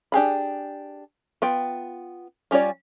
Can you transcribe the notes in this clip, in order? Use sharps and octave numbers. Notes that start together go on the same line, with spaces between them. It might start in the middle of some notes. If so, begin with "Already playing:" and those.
D4 G4 G#4 B5
B3 F4 G5
G3 C#4 F4 C#5 D5